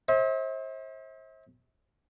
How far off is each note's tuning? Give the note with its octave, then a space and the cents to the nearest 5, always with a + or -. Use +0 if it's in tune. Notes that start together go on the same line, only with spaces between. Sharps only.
C5 +35 E5 -40